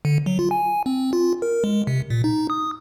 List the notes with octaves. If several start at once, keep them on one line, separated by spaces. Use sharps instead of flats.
D3
F#3
F4
G#5
C4
F4
A#4
G#3
C3
A#2
D#4
D#6